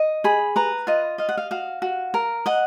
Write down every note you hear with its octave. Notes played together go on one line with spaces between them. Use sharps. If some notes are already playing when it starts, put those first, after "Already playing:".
Already playing: D#5
G#4 B5
B4 A#5
F4 D#5
D#5 F5
F#5
F5
F#4 F5
F#4
A#4
D#5 F#5